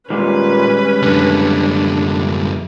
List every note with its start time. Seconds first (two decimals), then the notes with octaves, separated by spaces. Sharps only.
0.10 A#2 D#3 G3 G#3 C#4 B4
1.02 F#2 D3 D4